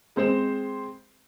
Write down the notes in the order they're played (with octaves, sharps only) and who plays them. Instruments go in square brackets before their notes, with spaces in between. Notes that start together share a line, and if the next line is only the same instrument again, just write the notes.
[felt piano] G#3 C4 C5 E7